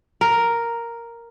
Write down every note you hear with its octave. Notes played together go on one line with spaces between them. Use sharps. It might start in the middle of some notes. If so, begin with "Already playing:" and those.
A#4